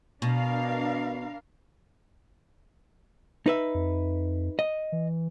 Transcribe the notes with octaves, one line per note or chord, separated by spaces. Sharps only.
B2 D4 A#4 F5
D#4 B4 E5
F2
D#5
E3